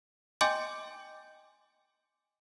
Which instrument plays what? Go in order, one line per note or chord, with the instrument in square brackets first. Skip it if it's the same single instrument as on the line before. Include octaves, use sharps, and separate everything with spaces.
[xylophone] D#5 G5 G#5 C6 D6 G6